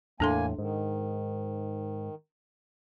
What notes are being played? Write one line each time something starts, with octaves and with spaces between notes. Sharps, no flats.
E2 A2 A#3 D4 A4 G#5 C6
G#2 D#3